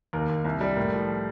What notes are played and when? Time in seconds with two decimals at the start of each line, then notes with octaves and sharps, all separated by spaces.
0.13 D#2 A#4
0.29 D#2
0.44 C2
0.61 G3
0.76 A2 A#4
0.93 F3